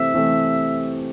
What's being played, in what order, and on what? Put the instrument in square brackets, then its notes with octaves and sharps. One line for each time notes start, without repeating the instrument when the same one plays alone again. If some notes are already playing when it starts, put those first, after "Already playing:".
Already playing: [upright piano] C3 E3 A3 C4 [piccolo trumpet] E5
[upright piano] C3 E3 A3 C4